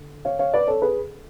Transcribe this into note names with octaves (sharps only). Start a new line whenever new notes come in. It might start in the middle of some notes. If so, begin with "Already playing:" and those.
Already playing: D3
C#5 F5
C#5 F5
B4 D5
A4 C#5
G#4 B4